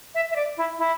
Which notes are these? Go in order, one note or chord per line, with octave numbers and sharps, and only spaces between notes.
E5
E5
D5
E4
E4